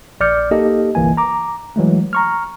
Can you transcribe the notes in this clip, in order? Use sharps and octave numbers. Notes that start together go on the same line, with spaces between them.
A#1 D5 D6 F6 G6 C#7
A#3 D#4 G4 A4 D#5
G1 C2 E3 A#3 G#5
A#5 D6
E3 F#3 G#3 A3
A#5 C#6 F6